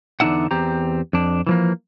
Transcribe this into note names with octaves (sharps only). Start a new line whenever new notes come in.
E2 D3 D4 D#4 E5 F#5
E2 C4 G4 A#5
F2 D4
E3 F3 A#3